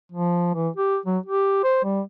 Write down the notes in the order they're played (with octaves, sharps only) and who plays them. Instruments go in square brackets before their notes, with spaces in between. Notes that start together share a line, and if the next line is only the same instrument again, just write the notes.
[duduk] F3
E3
G4
F#3
G4
C5
G3